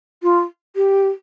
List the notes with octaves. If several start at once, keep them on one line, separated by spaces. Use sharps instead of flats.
F4
G4